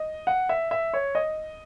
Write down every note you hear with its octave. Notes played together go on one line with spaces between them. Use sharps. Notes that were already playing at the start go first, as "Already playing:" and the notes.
Already playing: D#5
F#5
E5
E5
C#5
D#5